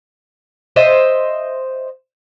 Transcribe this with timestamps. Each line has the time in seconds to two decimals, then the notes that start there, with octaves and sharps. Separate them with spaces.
0.76 C5 D#5 E5